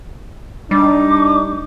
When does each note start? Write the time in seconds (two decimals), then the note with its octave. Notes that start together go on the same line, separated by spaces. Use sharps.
0.71 G3 D4 D#4 D6